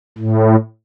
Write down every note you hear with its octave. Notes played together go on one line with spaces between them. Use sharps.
A2